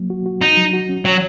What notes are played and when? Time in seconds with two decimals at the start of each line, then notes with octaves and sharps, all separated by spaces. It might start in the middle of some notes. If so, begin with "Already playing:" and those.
Already playing: F#3 A#3
0.10 F#4
0.26 F#4
0.41 D#4 F#4
0.57 F#3
0.73 F#4
0.89 C#4
1.05 F#3 C#5